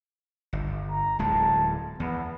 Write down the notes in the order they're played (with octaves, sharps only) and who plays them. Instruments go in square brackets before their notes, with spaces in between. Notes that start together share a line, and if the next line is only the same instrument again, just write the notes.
[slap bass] G1
[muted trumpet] A#5
[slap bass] D1 G#3 [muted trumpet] A5
[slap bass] E2 [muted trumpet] B3